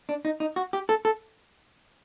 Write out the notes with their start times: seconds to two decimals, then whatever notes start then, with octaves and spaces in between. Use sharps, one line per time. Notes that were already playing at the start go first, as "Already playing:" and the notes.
0.09 D4
0.25 D#4
0.40 D#4
0.56 F#4
0.73 G4
0.89 A4
1.05 A4